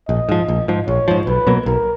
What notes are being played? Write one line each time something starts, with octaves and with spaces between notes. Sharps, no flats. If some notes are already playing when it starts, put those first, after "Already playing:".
A#1 D#5
G#2 F3
A#1
G#2 F3
A#1 C#5
G#2 F3
B1 B4
B2 F#3 A#3
B1 A#4